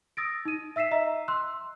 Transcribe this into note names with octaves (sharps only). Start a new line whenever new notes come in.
D#6 E6 A6 A#6 D7
D#4 D#7
E5 E6 B6 C7 E7
D#5 E5 A#5 E6
C6 E6 F#6